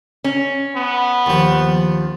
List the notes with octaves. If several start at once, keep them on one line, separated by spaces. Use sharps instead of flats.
C#4
B3
D#2 F3